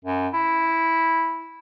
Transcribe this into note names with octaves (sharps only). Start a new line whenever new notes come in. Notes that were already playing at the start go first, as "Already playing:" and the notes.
F#2
E4